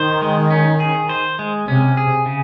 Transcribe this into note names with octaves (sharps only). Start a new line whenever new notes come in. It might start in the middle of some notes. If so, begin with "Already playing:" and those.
Already playing: D#3 C5
G#3
C#4
G#4
C5
G#3
C3 C#4
G#4
C#3